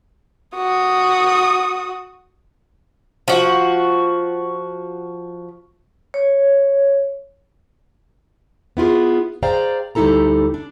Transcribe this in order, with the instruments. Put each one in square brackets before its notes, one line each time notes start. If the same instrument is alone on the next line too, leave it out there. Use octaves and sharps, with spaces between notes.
[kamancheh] F#4 D#6
[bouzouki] F3 F#4
[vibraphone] C#5
[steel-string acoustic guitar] B3 E4 F4 G#4
G#4 C5 D5 F5 G5 A#5
D2 G3 D#4 E4 A4 A#5
D4